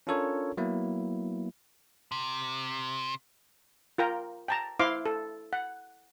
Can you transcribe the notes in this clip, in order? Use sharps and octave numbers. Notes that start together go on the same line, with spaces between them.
C#4 D4 F4 A4 A#4 C#5
F#3 A#3 B3 E4
C3
F4 A#4 G5 A#5
G5 A5 A#5
E4 C5 F5 C6 D6
A4
F#5